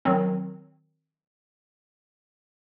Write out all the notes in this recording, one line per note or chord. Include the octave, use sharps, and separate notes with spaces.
D#3 F#3 C4